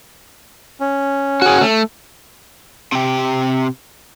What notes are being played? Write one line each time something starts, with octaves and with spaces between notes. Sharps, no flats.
C#4
F#4 G#4
A3
C3 G4